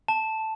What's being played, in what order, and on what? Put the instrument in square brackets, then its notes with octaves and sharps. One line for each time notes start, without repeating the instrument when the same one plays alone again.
[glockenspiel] A5